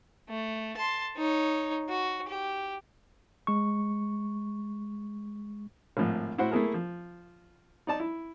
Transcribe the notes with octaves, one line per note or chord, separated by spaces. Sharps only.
A3
A5 C6
D#4 C#5
F#4
G4
G#3 C#6
G#1 A2 F3
A2 E4 F#4 C5 F#5
A3 A#3 E4 G#4 A#4
F3
D#4 D5 A5
E4